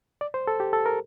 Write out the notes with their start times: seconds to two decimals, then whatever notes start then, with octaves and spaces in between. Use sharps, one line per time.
0.21 D5
0.34 C5
0.47 A4
0.60 G4
0.73 A4
0.86 A#4